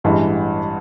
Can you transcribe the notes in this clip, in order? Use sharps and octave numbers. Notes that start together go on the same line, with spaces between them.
A1 G2 E3 G#3